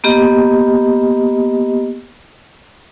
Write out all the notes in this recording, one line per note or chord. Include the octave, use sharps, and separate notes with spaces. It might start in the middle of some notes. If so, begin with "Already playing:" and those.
A#3 B3 G4 D#5